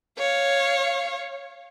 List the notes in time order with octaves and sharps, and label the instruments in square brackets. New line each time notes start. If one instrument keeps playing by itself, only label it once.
[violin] C#5 F5